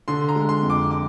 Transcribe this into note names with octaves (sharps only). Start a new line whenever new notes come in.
D3 C6
A#5
G#3
C6
F2
D6
D6